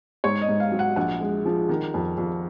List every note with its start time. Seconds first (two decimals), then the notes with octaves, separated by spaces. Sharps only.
0.24 G#2 C#5
0.41 D#5
0.49 G#2
0.60 F5
0.72 F#3
0.79 F#5
0.96 A#1 F#5
1.21 G#3
1.45 F3
1.69 D#3
1.94 F2
2.18 F2